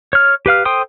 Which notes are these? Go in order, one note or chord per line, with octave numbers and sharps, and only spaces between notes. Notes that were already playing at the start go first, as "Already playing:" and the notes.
C#5 F6
G4 B4 F5 F6
A4 C5 G5 C6 D#6